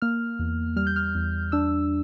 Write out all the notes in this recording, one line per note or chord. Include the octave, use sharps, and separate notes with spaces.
A#3 F6
E2
G3 F6
G6
F6
E2
D4 E6